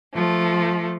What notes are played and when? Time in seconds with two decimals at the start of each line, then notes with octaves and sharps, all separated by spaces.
0.14 F3 A3